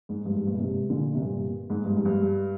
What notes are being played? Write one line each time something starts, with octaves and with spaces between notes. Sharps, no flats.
G#2
G2
G#2
G2 A#2
G#2 C3
A#2 D3
C3
G2 A#2
G#2
G2
G#2
G2